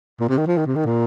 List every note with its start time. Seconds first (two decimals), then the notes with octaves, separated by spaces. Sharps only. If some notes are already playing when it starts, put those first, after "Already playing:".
0.20 A#2
0.29 C3
0.38 D#3
0.47 F3
0.57 D#3
0.66 C3
0.76 D#3
0.86 A#2